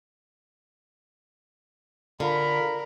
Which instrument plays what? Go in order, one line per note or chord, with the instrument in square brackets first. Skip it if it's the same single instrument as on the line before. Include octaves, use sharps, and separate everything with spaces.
[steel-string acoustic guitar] D3 [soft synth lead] F4 [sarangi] A#4 [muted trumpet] B5